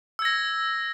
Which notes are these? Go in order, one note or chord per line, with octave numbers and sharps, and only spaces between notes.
E6 G#6 A#6